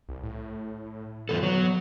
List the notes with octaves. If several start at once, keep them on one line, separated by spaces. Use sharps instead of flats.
C2
A2
E2 C3 B3 A4
F#3